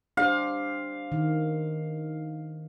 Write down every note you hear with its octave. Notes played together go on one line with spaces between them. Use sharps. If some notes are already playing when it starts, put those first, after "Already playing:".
D4 G4 C5 F5
D#3